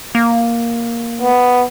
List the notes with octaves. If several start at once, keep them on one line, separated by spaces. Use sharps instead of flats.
A#3
B3